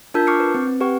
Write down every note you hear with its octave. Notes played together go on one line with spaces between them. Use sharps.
D4 F4 A#4 A5 E6 G6
C#6 D6 F6 G6 C7 C#7
B4
C4
C4
G4 B4 F#5 C#6